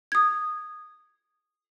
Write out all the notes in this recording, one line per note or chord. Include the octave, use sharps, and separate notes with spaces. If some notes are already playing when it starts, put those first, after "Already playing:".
D#6 G#6